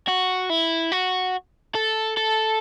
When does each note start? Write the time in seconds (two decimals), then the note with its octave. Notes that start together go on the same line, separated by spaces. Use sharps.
0.08 F#4
0.50 E4
0.92 F#4
1.75 A4
2.17 A4